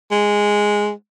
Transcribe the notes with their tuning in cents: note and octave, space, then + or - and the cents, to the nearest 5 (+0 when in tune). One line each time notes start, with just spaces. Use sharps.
G#3 -5